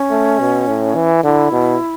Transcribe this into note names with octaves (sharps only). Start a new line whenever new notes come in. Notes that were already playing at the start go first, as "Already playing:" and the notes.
Already playing: C#4
A3
B2
A2
E3
D3 E4
B2